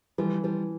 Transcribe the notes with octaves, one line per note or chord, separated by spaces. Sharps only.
E3 F3 G3
E3 F3 G3